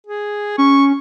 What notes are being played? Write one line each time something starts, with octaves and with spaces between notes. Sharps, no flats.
G#4
C#4 C#6